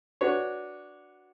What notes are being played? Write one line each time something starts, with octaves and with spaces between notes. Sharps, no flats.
D4 F#4 B4 C#5